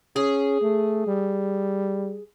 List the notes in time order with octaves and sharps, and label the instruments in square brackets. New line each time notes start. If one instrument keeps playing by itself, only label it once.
[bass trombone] C#4 [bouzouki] G#4
[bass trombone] A3
G3